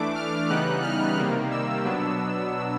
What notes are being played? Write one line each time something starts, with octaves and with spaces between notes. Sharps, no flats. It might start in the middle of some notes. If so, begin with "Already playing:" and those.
Already playing: E3 A3 D4 D6
F6
C#3 E3 G3 B3 D#4 F#6
F6
C3 D#3 G3 A#3
E6
B2 F#3 B3 D4